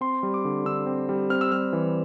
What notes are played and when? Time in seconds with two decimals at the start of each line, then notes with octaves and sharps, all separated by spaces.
0.01 C4 C6
0.23 G3
0.34 D6
0.45 D3
0.65 D3 E6
0.86 C4
1.09 G3
1.30 C4 F6
1.41 E6
1.52 G3 F6
1.73 E3